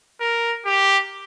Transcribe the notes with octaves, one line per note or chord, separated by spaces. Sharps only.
A#4
G4